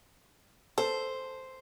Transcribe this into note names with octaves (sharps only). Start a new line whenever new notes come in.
A4 C5